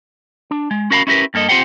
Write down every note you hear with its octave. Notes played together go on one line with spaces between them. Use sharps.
D4
G#3
C#4 F#4 A#4 F5 G#5 B5
C#4 E4 G4 A#4 B4
G2 A#3 A4 D#5
C4 F4 G4 C5 F#5 G5